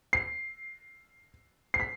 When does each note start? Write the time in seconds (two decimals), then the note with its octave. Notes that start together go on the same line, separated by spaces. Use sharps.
0.13 C7
1.74 C7
1.80 B6